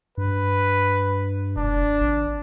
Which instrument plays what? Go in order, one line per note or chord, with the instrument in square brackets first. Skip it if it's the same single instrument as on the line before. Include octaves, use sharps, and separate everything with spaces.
[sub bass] G2 [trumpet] B4
[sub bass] F1 [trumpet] D4
[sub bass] G#1